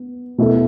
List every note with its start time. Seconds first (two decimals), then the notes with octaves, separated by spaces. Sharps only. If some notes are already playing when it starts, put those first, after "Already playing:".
Already playing: B3
0.38 B2 A3 E4 A4